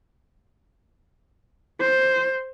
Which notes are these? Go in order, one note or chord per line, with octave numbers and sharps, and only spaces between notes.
C5